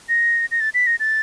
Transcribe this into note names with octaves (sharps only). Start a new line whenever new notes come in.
A#6
A#6
A6
B6
A#6
A6